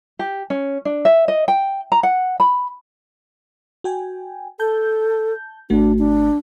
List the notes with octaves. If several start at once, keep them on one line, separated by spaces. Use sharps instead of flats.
G4
C#4
D4
E5
D#5
G5
A#5
F#5
B5
F#4 G5 G#5
A4 A5 G6
G#1 A3 D4 F#4
D4